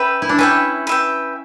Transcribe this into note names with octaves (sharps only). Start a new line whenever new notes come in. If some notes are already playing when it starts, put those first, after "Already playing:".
Already playing: C#4 B4 E5 G5
E4
D4
C#4 B4 E5 G5
B4 E5 G5